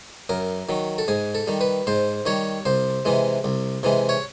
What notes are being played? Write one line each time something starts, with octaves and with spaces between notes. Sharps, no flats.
F#2 A#4
D#3 F#3
A4
G#2 G#4
A4
D#3 G3
B4
G#2 C5
D#3 G3 C#5
C2 C5
C3 E3 G#3
C2
C3 E3 G#3
C#5